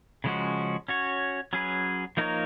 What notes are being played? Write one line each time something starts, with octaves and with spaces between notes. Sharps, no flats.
C#3 F3 G#3 C#4 F#4
C#4 F#4 C#5
F#3 C#4 G#4 B4
F3 A#3 D#4 A#4 C#5